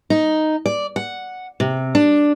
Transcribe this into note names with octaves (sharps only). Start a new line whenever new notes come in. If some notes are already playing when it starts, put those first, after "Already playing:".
D#4
D5
F#5
C3
D4